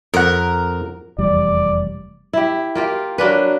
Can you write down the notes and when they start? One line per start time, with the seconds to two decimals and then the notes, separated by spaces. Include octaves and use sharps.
0.14 F2 A#4 F#5
1.18 F1 E2 G3 D5
2.33 E4 G4
2.75 A#3 F4 G4
3.18 F#3 A#3 D4 B4